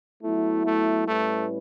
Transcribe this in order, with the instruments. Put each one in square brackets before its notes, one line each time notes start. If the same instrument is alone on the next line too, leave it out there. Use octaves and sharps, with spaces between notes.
[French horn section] F#3 B3 E4 [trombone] A3
[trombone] A3
[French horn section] A2 G3 C#4 E4 B4 [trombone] A3